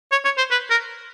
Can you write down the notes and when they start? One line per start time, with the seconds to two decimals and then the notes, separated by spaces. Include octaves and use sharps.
0.11 C#5
0.25 C#5
0.38 C5
0.51 B4
0.70 A#4